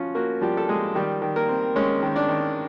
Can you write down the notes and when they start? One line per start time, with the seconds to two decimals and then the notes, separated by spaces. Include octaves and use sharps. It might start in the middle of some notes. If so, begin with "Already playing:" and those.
Already playing: F3 C#4 F4 F#4
0.15 A#3 F#4
0.41 F3 G3 G4
0.57 A4
0.68 F3 G#3 G#4
0.95 D#3 G3 G4
1.22 D#3
1.36 A#3 A#4
1.49 C4
1.76 G#3 C#4 C#5
2.03 D#3
2.16 D4 D5
2.29 D#3